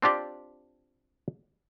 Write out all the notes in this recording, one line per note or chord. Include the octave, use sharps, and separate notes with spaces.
C4 D4 F4 G4 D5